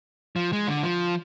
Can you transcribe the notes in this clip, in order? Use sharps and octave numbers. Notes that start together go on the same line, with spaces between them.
F3
G#3
D3
F3